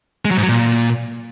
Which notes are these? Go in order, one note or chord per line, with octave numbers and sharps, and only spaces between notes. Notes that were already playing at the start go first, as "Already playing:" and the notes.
G#3
F#3
G#2
F#3
A#2